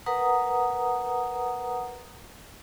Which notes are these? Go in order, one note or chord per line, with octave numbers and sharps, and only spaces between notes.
A#4 B4 F#5 A#5 D#6